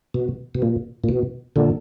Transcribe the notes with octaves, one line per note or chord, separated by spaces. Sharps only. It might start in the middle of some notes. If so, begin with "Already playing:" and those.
B2
B2
A#2
A#2
B2
A#2 D3